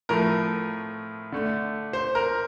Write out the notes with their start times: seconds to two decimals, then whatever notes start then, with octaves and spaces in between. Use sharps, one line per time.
0.09 A2 F3 A3 A#4
1.32 D3 A3
1.93 C5
2.15 A#4